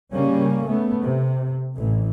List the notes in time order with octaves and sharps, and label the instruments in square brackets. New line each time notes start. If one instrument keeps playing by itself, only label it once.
[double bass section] C#3 G3 A#3 C#4
A3 B3
C3
A1 E3